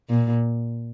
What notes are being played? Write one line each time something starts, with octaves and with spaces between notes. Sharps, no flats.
A#2